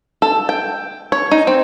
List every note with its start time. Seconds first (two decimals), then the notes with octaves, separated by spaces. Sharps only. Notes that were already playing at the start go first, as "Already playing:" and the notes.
0.22 A4
0.49 G5
1.12 C#5
1.31 D#4
1.47 C4